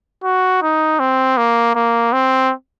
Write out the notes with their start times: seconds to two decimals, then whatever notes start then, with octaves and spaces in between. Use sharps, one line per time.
0.24 F#4
0.62 D#4
1.00 C4
1.38 A#3
1.75 A#3
2.13 C4